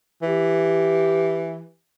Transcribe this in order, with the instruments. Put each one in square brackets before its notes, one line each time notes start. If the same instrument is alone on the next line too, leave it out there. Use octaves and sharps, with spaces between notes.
[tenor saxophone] E3 [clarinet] G4